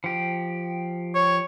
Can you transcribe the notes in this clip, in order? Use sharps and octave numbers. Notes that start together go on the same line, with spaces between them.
F3 G4
C#5